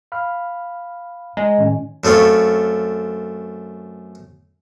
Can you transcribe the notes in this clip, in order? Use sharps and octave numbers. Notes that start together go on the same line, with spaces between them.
F5 B5 F6
G#3 A#5
A2 D#3 C#4
F#2 A3 C4 F4 C#5